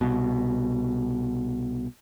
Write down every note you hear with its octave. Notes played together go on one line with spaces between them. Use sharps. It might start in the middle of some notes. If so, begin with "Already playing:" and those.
C2 B2